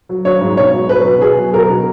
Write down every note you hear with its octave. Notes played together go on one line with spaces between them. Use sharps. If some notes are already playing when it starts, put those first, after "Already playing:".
F#3
F#3 C#5
G#2
B2 C#5
F#3
F#3 B4
B2
B2 G#4
F#3
F#3 A#4
B2